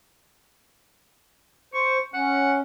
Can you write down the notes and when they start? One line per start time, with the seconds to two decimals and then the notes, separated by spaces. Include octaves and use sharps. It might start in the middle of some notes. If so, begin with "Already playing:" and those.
1.74 C5 C#6
2.14 C#4 F#5